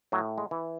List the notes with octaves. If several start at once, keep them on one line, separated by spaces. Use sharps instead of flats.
A2 F#3
G#3
E3